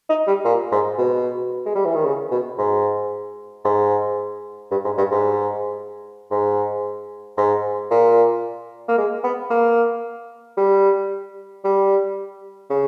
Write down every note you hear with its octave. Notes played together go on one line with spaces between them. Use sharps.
D#4
G3
A#2
G#2
B2
G#3
G3
E3
D#3
C#3
B2
G#2
G#2
G2
G#2
G2
G#2
G#2
G#2
A#2
A#3
G#3
B3
A#3
G3
G3
C#3